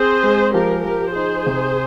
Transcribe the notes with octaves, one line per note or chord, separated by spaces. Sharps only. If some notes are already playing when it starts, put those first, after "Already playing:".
Already playing: C4 G#4 C5
G#3
F3 G4 A#4
F3 G4 A#4
D#4 G#4 C5
C3